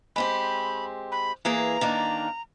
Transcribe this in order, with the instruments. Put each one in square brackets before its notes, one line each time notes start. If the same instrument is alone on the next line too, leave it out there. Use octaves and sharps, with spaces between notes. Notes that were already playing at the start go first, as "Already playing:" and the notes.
[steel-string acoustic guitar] G#3 C4 G4 [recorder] B5
[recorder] B5
[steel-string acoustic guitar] E3 A#3 G#4 [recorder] A#5
[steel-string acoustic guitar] D#3 A#3 D4